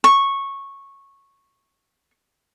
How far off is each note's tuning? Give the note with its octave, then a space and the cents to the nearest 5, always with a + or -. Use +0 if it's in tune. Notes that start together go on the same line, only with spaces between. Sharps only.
C#6 -10